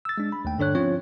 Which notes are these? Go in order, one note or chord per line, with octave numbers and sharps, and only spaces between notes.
E6 A6
G#3 D4
B5
D#2 A3 G5
G2 D3 D4 C#5 F#6
F3 C4 C#4 F4 C#5